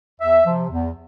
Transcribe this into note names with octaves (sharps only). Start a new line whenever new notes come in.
E2 E5
C3 F3
E2